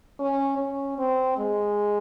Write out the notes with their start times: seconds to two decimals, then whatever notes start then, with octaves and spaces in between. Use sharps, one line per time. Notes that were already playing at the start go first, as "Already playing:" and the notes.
0.19 C#4
0.58 C#4
0.98 C4
1.38 G#3